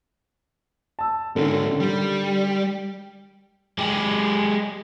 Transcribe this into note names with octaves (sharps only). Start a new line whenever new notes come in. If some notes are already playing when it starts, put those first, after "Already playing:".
A5 E6
G#2 D3 D#3 C#4
G3
G#3 G4